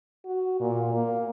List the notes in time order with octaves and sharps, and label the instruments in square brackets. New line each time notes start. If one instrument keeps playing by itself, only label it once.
[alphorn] F#4
A#2
A#3